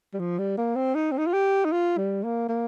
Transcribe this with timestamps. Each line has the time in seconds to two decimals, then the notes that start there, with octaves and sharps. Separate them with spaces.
0.14 G3
0.19 F3
0.38 G3
0.58 A#3
0.76 C4
0.95 D#4
1.12 C4
1.18 D#4
1.27 F4
1.33 G4
1.65 D#4
1.72 F4
1.98 G3
2.23 A#3
2.49 A#3